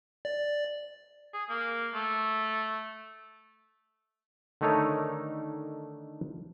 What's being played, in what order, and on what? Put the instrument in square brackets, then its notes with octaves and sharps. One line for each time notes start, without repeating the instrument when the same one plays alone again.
[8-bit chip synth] D5
[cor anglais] G#4
A#3
A3
[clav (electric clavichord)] D3 D#3 A3 D#4 A#4 C#5